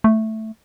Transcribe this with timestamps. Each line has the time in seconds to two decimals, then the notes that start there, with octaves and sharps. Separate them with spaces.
0.04 A3